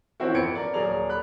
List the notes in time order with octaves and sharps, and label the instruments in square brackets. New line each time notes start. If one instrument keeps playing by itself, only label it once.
[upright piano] E3 F3 C4 C#4 E4 F#4
F2 B3 G#6 C#7 D7
A#4 D5
D#1 F#3 G#4 A#4 D5 F7
B5 F#6